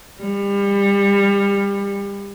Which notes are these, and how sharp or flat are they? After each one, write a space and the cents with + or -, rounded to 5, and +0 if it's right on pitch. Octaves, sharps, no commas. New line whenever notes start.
G3 +30